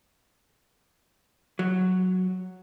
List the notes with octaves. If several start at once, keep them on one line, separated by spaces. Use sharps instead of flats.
F#3